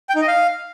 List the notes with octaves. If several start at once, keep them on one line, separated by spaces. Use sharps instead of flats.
G5
D#4
D#5
F5